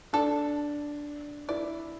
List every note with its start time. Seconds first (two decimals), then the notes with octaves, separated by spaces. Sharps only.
0.13 D4 A4
1.48 E4 D5